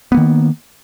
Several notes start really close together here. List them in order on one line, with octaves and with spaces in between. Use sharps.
B3 A#3 D#3